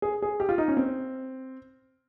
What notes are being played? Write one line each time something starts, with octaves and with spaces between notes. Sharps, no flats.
G#4
G#4
G4
F4
D#4
C#4
C4